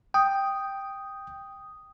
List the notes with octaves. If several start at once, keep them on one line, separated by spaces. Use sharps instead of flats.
G5 D#6